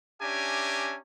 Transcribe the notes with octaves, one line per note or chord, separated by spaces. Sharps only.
C#4 D4 G4 E5 G#5 A#5